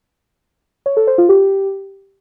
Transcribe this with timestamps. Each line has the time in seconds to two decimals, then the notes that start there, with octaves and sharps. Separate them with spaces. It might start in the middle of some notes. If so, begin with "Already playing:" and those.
0.86 C#5
0.97 A4
1.07 C5
1.18 F4
1.29 G4